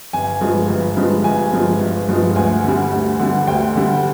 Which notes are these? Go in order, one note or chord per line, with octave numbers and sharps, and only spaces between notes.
G1 G#5
G2 F3 G#3
G1
G2 F3 G#3
G1 G#5
G2 F3 G#3
G1
G2 F3 G#3
D2 G#5
D3 G3
D2
D3 G3
D2 G5
D3 G3